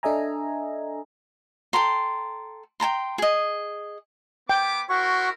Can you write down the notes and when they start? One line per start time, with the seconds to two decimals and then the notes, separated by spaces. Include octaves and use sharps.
0.03 D4 A4 D#5 E5 G#5 A#5
1.73 A4 G5 A#5 C6
2.80 G5 A5 A#5 C6
3.18 G#4 D#5
4.49 B3 G5 B5 D6
4.89 E4 F#4 A#4 C5 C#6